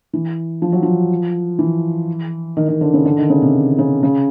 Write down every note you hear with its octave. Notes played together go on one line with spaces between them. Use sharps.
E3
F3
F#3
F3
E3
D#3
D#3
D3
C#3
D3
D#3
C#3
C3
C#3
C#3